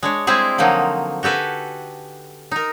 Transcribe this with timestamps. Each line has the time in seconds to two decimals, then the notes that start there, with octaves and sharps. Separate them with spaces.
0.03 G#3 D4 C#5
0.27 G3 G#3 C4 E4 G#4
0.58 D3 F3 F#3 A#3 D#4
1.23 F#4 G4 A4 B4 G#5
2.51 D#4 A#4